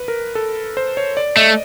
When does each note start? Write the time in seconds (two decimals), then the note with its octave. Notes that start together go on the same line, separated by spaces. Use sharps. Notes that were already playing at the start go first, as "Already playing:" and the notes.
Already playing: B4
0.08 A#4
0.35 A4
0.77 C5
0.97 C#5
1.17 D5
1.36 A3 D#5